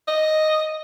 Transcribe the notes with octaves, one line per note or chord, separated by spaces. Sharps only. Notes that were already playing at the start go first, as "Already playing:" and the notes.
D#5